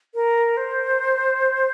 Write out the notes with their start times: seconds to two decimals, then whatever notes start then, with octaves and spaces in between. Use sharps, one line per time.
0.15 A#4
0.57 C5